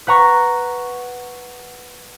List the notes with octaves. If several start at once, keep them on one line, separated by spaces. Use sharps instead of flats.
B4 F#5 A#5 C#6